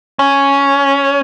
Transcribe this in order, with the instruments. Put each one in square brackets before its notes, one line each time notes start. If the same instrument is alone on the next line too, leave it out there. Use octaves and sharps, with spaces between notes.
[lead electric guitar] C#4